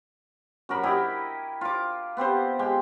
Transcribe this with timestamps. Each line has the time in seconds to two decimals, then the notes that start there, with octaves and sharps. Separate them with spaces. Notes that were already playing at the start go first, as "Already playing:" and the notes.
0.69 F#2 F#4 A#4 B5
0.83 E4 G4 D#5
1.61 F4 D6
2.17 B3 C4 G4 C5
2.59 G#3 G4 G5